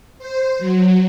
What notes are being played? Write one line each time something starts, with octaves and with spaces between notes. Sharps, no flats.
C5
F#3